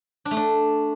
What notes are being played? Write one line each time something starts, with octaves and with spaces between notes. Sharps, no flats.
D4
A3
D4